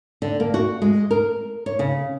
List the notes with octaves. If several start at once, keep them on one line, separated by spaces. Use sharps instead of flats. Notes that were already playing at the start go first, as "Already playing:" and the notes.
D3
A#3
F#4
G#3
A#4
C#5
C#3